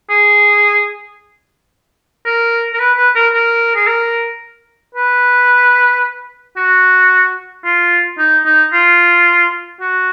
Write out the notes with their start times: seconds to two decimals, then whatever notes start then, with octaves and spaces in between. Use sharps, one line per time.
0.10 G#4
2.26 A#4
2.73 A#4
2.79 B4
2.97 B4
3.15 A#4
3.34 A#4
3.76 G#4
3.87 A#4
4.95 B4
6.57 F#4
7.65 F4
8.18 D#4
8.45 D#4
8.73 F4
9.80 F#4